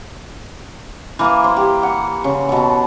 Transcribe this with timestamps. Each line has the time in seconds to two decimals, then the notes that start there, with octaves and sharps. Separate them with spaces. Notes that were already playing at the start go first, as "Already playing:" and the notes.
1.19 E3 A#3
1.44 C5
1.57 G4
1.83 F#5
2.24 C#3
2.49 B2 A5